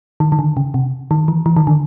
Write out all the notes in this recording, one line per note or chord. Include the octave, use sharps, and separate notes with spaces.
D#3
D#3
D3
C#3
C3
D#3
E3
E3
D#3
D3